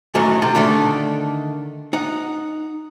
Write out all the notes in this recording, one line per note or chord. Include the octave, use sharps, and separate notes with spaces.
F#2 A2 D#3 E3 F#3
C3 D#3
D3 D#3 A3 D4
D#4 F#5